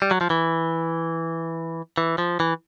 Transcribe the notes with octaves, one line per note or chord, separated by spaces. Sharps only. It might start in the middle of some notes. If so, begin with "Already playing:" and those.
G3
F#3
F3
E3
E3
F3
E3